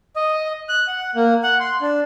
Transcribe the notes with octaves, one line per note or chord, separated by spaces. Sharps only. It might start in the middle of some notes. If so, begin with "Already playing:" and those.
D#5
F#6
F#5
A#3
F#5
C6
D4